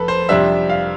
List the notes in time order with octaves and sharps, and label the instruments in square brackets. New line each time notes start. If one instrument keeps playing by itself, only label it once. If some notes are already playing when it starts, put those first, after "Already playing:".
Already playing: [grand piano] F1 A4 B4
C5
F2 C3 G3 D4 E5
F5